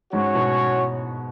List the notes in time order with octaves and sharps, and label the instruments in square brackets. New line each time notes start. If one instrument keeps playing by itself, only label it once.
[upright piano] G#2 [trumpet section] C#4 F#4 C#5
[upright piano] B2